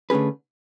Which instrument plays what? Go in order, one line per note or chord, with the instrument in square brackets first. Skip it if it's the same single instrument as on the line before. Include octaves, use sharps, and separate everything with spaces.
[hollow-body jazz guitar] D3 A3 C#4 G#4 B4